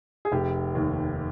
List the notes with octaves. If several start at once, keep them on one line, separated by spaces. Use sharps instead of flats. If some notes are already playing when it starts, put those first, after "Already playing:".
G#4
F1 G4
D#2